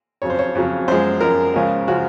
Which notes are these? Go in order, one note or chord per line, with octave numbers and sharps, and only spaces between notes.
F2 C#3 F#3 C#5
C5
C#5
F2 C#3 F#3
F#2 F3 G#3 C5
F#2 F3 G#3 A#4
C#2 C#3 F3 G#3
C#3 F3 G#3 F#4